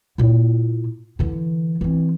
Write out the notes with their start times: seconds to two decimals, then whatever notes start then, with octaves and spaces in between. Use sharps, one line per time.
0.18 A#2 E4
1.19 D3 E3
1.81 E3 C4